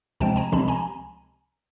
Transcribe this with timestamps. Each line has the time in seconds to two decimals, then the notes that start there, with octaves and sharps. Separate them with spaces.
0.20 C#2 C3 F3 G#3 C4 G5 A5
0.36 G#5 A#5
0.52 C#2 C3 F3 G#3 C4 A5 B5
0.68 G#5 A#5